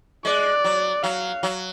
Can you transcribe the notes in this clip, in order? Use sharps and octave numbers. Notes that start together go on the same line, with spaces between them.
G#3 D5
F#3
F#3 F5
F#3